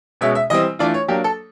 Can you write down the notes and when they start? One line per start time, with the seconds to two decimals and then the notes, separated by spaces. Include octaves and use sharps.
0.21 B2 G#3 C#4 E5
0.35 E5
0.50 E3 G3 C4 D#5
0.79 E3 A3 D4 F4 D5
0.94 C#5
1.08 F#3 A#3 D4 G4
1.24 A4